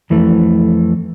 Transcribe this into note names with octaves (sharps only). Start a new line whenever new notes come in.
F2 E3 A3